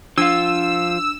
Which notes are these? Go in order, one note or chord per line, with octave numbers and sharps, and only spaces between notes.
F3 D4 F4 E6